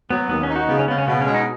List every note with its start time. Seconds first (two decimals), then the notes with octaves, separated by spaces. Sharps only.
0.10 F#3 B3
0.29 D#2 B3
0.43 C#4
0.50 D#4
0.56 F#4
0.68 C#3 B3
0.79 C#4
0.88 C#3 B3
0.98 C#4
1.08 B2 B3
1.21 C#4
1.27 G#3
1.34 D#4